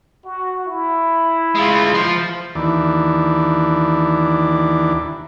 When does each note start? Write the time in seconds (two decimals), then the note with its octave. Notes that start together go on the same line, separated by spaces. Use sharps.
0.25 F#4
0.66 E4
1.55 G#3 F4
1.94 F3 C5
2.55 D#2 E3 D4